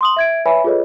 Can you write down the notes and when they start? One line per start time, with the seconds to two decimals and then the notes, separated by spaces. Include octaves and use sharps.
0.01 C6 D#6 F#7
0.17 E5 G#6 D7
0.46 B4 C#5 E5 G#5 B5
0.64 F4 G#4 A4 B4 C#5 D#5